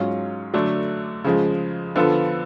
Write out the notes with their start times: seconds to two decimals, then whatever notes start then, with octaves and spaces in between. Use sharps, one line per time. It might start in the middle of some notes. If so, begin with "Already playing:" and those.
Already playing: G#2 F#3 C#4 F4
0.54 D3 F#3 A3 D4
1.24 C#3 F3 G#3
1.96 D3 F3 B3 F4 A4